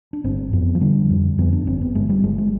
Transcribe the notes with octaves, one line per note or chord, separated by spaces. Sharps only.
D4
G1 C4
F2 B3
F3
D3 G3
F2
F2 B3
D4
G1 C4
B3
G1 G#3
G3
G1 G#3
G#3